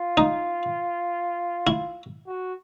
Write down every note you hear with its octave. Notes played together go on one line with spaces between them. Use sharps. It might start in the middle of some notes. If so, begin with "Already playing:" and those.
Already playing: F4
D#4
E4
F#4